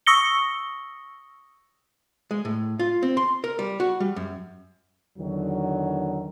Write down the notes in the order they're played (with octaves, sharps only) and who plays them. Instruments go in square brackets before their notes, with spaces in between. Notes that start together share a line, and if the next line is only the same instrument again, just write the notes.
[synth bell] C#6 D#6 E6 A#6 C#7 G7
[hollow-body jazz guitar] G#3
A2
F4
C4
C6
A#4
G3
F#4
G3
F#2
[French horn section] E2 D3 D#3 F#3